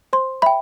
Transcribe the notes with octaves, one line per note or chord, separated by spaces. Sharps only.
C5 C6
E5 G5 B5